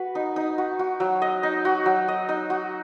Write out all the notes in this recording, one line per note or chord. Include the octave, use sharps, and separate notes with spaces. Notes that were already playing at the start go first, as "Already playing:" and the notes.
Already playing: F#4 B4
D#4
D#4
F#4
F#4
F#3
D#5
D#4
F#4
F#3
D#5
D#4
F#4